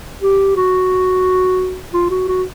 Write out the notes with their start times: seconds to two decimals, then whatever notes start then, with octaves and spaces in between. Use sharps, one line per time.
0.22 G4
0.56 F#4
1.94 F4
2.10 F#4
2.28 F#4